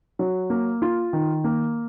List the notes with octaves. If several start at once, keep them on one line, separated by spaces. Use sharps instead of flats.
F#3
A#3
F4
D#3
A#3